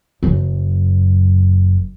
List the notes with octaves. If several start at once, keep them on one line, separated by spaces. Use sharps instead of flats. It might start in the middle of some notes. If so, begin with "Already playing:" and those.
F#1 F#2